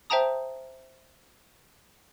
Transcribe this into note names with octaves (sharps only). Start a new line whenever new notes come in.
C5 E5 G5 A5 A#5 D#6